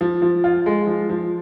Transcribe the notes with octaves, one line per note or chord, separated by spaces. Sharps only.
F3
F3
F4
G#3
F3
F3